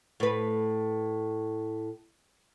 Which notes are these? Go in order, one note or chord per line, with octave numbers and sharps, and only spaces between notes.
A2 B4